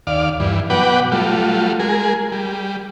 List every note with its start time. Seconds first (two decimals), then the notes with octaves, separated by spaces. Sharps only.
0.07 D#2 D5 F5
0.40 G2 E3
0.70 B2 F#3 B4 F#5 G5 D6
1.12 F#3 G3 A3 F4
1.80 G#3 G#4 A#4
2.32 G3